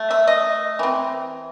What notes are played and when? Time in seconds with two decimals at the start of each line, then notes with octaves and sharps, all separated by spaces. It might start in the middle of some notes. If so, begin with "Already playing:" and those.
Already playing: A3
0.10 E5
0.27 D#5
0.79 E3 C4